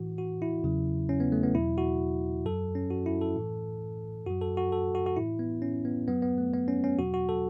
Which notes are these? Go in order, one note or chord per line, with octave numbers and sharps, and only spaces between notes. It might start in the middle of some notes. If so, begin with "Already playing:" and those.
Already playing: A2 E3 F#4
F#4
E4
E2 C#3 F#3
C#4
B3
A3
B3
E2 B2 F#3 E4
F#4
F#2 F#3 A4
C#4
F#4
E4
A4
A2 E3
F#2 F#3 F#4
A4
F#4
A4
F#4
F#4
A2 E3 E4
B3
C#4
B3
F#2 F#3 B3
B3
A3
B3
C#4
C#4
E2 B2 F#3 F#4
F#4
A4